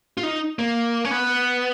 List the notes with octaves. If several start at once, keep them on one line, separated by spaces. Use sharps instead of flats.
F4
D#4
A#3
C#4
B3